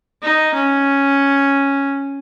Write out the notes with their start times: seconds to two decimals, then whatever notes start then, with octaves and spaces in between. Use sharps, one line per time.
0.22 D#4
0.54 C#4